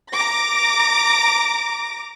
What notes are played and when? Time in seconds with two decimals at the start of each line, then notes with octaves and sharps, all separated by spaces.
0.12 A#5 D6 A#6